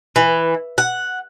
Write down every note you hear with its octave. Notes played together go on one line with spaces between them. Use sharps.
E3
F#5